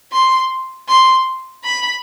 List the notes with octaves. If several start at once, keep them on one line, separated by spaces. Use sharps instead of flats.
C6
C6
B5